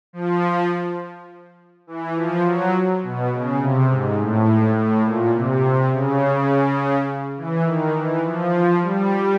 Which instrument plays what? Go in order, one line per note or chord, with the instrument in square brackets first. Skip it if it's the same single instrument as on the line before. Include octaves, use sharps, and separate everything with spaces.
[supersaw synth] F3
E3
F3
F#3
B2
C#3
C3
G#2
A2
A2
A#2
C3
C#3
E3
D#3
E3
F3
G3